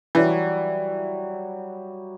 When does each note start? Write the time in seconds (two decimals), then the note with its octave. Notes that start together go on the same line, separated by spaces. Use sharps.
0.15 E3 F#3 G3 E4